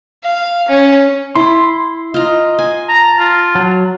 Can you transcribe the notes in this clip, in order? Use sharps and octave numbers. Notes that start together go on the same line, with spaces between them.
F5
C#4
E4 C6
F4 D#5 A#5
G#5
A5 A#5
F4
F#3